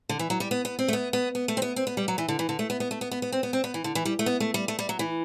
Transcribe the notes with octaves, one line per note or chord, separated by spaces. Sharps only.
D3
E3
F#3
G3
B3
B3
C4
A3
B3
B3
B3
A3
C4
B3
C4
B3
G3
F#3
E3
D3
E3
D3
A3
B3
B3
A3
B3
B3
B3
C4
B3
C4
B3
E3
D3
E3
G3
A3
B3
A3
G3
A3
G3
F#3
E3